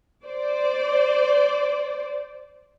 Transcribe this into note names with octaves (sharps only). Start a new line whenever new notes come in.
C5 D5